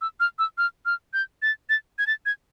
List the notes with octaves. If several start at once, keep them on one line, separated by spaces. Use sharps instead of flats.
E6
F6
E6
F6
F6
G6
A6
A6
G#6
A6
G#6